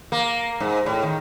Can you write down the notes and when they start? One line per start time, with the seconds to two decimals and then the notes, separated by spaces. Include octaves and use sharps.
0.12 A#3
0.60 G#2
0.86 A2
1.03 D#3